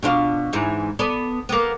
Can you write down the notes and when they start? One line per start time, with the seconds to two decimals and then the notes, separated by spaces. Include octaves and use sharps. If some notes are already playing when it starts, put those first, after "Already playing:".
0.03 B2 D4 F4
0.53 E2 G#2 E3
0.99 B3 A4 D5
1.49 A#3 B3